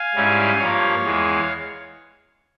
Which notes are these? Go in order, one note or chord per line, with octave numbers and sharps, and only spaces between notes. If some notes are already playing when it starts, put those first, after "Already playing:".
Already playing: F5 G#5
G#2 G3 C#4 E4
G2 F3 A#3 C#5 F5
E2 E3 G#3